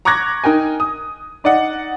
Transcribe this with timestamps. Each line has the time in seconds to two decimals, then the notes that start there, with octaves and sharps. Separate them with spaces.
0.05 A#5 C#6 D6 F#6 G#6 A#6
0.44 D#4 A#4 G5 G#5
0.80 D#6
1.44 D#4 D5 D#5 F#5